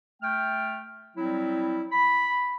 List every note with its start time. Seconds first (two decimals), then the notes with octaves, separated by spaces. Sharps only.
0.22 A3 G5 F6
1.17 F#3 G3 C4 E4
1.92 B5